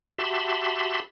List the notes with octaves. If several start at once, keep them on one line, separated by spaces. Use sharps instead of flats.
F#4 G4 E5 A5 B5 C6